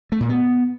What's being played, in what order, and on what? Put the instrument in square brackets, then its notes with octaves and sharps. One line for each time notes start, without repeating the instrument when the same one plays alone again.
[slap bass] A3
A#2
B3